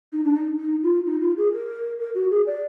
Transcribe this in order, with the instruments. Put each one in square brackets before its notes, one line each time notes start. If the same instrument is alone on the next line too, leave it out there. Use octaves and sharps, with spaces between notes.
[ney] D#4
D4
D#4
D#4
F4
D#4
F4
G#4
A#4
A#4
F#4
G#4
D5